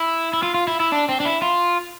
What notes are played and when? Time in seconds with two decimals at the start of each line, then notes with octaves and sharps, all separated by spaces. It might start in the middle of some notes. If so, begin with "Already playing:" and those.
Already playing: E4
0.33 E4
0.43 F4
0.54 F4
0.67 E4
0.80 E4
0.92 D4
1.09 C4
1.20 D4
1.25 E4
1.42 F4